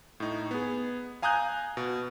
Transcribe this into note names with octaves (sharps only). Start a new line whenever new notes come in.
A2 D#4
B3 G#4
F5 G#5 A#5 D#6 F#6 G6
B2